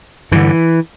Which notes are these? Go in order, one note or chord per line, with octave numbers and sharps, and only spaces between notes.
G2 D3 E3